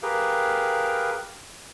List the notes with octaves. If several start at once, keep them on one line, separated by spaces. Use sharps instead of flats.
G4 G#4 A#4 B4 F5 G5